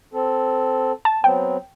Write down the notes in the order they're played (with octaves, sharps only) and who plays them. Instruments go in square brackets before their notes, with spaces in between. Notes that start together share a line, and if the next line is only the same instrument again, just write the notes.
[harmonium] C4 A4
[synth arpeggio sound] A5
[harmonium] F#3 B3 C4 [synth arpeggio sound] G5